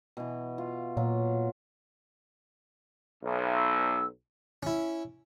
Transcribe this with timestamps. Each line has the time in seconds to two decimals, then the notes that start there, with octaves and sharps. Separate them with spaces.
0.17 B2 E3
0.58 F4
0.97 A#2 F#3 F4
3.24 B1
3.55 E6
4.63 C#4 E4